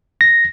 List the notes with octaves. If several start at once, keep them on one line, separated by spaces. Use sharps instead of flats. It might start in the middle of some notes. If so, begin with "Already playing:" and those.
A#6